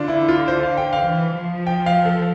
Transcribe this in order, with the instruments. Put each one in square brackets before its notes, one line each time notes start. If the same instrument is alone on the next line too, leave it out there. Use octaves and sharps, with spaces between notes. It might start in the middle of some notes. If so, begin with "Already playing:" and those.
Already playing: [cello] D3 [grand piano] D4 F4
[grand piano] E4
F4
C5
F5
G5
F5
[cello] E3
F3
[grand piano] G5
F5
A4